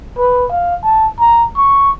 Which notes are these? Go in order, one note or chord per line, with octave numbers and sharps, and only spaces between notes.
B4
F5
A5
A#5
C#6